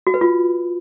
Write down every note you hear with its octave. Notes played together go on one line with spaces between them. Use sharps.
F#4
B4
F4